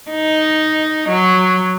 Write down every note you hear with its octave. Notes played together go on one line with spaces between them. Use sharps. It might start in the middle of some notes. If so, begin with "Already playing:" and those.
D#4
F#3